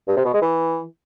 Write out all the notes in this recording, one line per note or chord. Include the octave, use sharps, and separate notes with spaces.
G2
C3
B2
G#3
E3